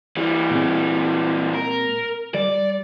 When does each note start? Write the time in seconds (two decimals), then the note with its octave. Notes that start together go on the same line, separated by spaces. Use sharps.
0.17 E3 G3
0.51 A#2 G#3 C4
1.55 A#4
2.34 G3 D5